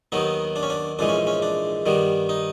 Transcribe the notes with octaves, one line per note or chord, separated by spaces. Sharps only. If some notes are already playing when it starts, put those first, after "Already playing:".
D#2 D#3 F#3 B3 D#4
D4
C#4
D4
A#1 G#2 E3 G#3 D4
C#4
C#4
D4
G2 D#3 G3 B3
D#4